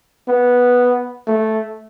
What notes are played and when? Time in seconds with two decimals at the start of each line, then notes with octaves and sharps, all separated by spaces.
0.28 B3
1.27 A3